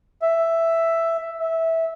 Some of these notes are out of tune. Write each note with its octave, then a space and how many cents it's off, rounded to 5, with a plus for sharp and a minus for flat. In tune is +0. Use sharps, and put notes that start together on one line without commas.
E5 +5
E5 -15